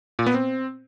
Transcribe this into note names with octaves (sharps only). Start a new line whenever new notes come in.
A#2
B3
C4